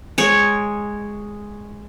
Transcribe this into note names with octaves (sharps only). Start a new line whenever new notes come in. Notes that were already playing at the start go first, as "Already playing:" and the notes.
G#3 C#5